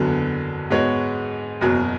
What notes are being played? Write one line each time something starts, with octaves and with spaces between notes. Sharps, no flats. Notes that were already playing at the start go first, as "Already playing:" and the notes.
Already playing: F#1 E2 D3 F#3 B3
G#2 G#3 B3 F#4 C#5
F#1 E2 B2 F#3